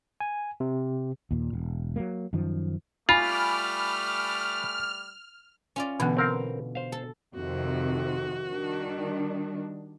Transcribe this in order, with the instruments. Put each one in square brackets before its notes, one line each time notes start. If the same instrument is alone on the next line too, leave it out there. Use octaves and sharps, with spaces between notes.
[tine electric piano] G#5
C3
[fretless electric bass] D#2 A#2
E1
F#3 G#3 A#3
F#2 D#3 F3
[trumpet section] G3 A3 D6 [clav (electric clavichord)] F4 [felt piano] G#5 B5 [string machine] F6
[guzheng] C#4 F4 D5
[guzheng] B2 D3 [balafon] E3 B3
[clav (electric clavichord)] C4 A#4 F5
C5 F5
[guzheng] A4
[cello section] F2 C3 D#3 [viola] F#4
[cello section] D#3 G3 D4